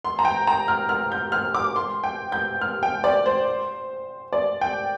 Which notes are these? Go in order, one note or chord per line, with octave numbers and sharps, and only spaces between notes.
C6
A#5
G5
A#5
F6
F6
G6
F6
D6
C6
G5
G6
F6
G5
D5
C5
D5
G5